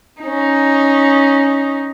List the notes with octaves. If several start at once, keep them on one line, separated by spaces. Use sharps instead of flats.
C#4 D#4